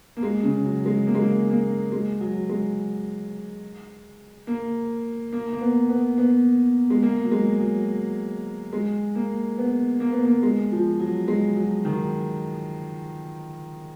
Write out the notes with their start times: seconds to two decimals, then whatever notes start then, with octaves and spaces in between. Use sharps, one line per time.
0.17 A#3
0.23 G#3
0.43 C#3
0.64 F#3
0.86 G#3
1.07 A#3
1.15 G#3
1.22 A#3
1.50 A#3
1.92 G#3
2.20 F#3
2.49 G#3
4.47 A#3
5.33 A#3
5.53 A#3
5.61 B3
5.89 B3
6.18 B3
6.90 G#3
7.03 A#3
7.24 F#3
7.32 G#3
7.60 F#3
8.73 G#3
9.15 A#3
9.58 B3
10.00 A#3
10.13 B3
10.25 A#3
10.43 G#3
10.72 F3
10.99 F#3
11.28 G#3
11.56 F#3
11.85 D#3